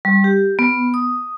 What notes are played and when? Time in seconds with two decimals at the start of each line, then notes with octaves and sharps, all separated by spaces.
0.05 G3
0.24 G4
0.59 B3
0.94 D#6